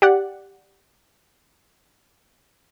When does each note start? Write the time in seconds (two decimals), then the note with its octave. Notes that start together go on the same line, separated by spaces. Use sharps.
0.02 G4 D5 F#5